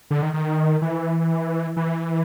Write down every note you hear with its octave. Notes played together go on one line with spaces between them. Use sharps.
D3
D#3
D#3
E3
E3